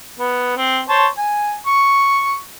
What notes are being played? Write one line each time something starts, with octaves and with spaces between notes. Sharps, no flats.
B3
C4
C5 C#5 A5
G#5
C#6